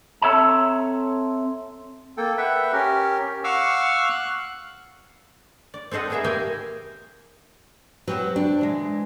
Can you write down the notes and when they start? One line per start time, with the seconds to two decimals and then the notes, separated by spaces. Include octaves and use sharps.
0.22 C4 A4 C#5 E5 A5 A#5
2.17 A#3 A4 G5
2.38 B4 E5 F#5 G5
2.73 C#4 G4 A#4
3.44 F5 F#5 C#6 D6 E6 F6
4.10 F#6
5.74 D5
5.91 C4 A4 C5 D#5 F#5
6.10 G#3 B3 G#4 A#4 E5
6.24 A#3 C4 G4 A#4 G5 G#5
8.08 F#3 C4 G4 B4
8.36 D3 D4
8.59 B2 E3 G#3